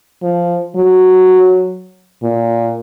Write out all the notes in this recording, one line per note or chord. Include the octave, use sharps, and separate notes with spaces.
F3
F#3
A#2